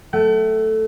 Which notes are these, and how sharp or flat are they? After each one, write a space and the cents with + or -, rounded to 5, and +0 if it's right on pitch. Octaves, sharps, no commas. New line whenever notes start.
A3 +0 F#5 +45